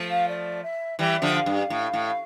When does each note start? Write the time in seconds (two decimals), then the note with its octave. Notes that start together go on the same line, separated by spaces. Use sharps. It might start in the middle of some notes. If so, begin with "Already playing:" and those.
Already playing: F3 A3
0.09 F5
0.28 D5
0.63 E5
0.99 E3 G3 E5
1.22 D3 F3
1.35 F5
1.46 G2
1.70 A2
1.93 A2